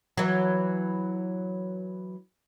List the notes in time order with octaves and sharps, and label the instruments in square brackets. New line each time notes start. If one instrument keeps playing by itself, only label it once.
[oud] E3 F#3